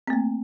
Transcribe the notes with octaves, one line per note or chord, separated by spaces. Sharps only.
A3 A#3 C4